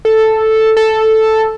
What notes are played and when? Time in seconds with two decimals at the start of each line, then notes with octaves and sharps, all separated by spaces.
0.05 A4
0.77 A4